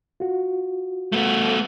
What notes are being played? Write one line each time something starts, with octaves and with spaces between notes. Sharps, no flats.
F4 F#4
A3 B3